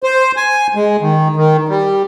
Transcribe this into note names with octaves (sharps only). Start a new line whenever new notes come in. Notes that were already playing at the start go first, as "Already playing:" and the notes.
C5
G#5
G#3
D#3
D#3
G3